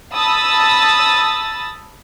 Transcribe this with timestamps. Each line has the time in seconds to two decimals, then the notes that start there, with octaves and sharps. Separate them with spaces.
0.14 A5 B5 D#6 E6 A6